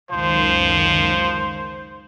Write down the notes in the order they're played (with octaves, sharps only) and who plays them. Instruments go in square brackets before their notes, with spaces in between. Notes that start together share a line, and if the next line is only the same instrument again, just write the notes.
[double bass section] C#2 F#2 D#3 [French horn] F3 [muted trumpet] C5